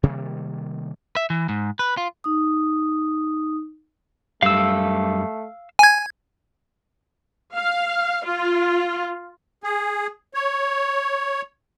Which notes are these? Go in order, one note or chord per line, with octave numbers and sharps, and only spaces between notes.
C3 D#3 G3 A#3
E5
E3
G#2
B4
F4
D#4 D#6
F#2 G3 A3 F5 E6
G#5 G#6
F5
F4
G#4
C#5